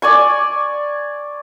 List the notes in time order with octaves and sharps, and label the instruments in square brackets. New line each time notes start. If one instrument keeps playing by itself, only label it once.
[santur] D5 G#5 C#6